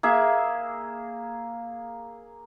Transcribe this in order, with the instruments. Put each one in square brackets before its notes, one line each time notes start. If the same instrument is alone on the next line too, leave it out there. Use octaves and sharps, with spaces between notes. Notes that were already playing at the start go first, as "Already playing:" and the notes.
[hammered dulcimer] A#3 G#4 E5